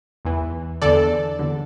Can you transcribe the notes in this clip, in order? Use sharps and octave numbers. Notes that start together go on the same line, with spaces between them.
E2 E3
E2 D3 A4 D5
E2 D3